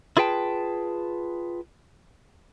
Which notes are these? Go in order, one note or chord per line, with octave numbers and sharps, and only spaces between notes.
E4 F4 G#4 B4 G5 A5